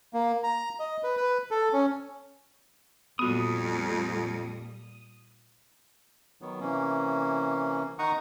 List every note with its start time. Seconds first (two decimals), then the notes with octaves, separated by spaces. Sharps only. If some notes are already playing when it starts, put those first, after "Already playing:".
0.14 A#3
0.44 A#5
0.80 D#5
1.04 B4
1.17 B4
1.51 A4
1.73 C#4
3.19 F2 A#2 G3 B3 F#4 D#6
6.41 D#3 F#3 B3
6.60 C3 E3 A#3 C#4
7.99 D#3 D#4 F#5 A#5 C#6 D#6